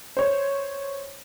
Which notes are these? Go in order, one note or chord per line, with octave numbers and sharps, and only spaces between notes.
C5 C#5